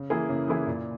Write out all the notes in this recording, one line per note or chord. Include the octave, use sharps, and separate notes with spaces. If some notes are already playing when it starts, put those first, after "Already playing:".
Already playing: C#3
E3 A#3 E4 G#4
C#3
E3 A#3 E4 G#4
A#2